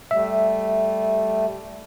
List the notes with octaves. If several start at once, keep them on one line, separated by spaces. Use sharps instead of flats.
G3 A3 E5